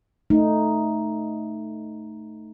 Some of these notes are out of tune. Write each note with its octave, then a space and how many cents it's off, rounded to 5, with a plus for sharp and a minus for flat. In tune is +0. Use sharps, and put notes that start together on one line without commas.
A3 +0 D#4 +0